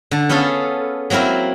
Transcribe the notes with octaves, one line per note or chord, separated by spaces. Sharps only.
D3 A5
B3 C#4 F4 G#4 A4
F#3 A#3 C4 E4 A#4